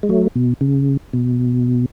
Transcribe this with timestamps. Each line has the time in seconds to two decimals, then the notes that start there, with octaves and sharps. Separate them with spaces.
0.03 G#3
0.09 F#3 A3
0.35 B2
0.61 C#3
1.13 B2